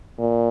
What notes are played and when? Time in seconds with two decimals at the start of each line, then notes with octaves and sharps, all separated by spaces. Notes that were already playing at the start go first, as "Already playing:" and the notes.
0.19 A#2